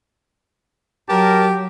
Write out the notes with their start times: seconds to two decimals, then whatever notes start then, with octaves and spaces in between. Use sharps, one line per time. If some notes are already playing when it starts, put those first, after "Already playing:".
1.09 F#3 G4 A#4 A5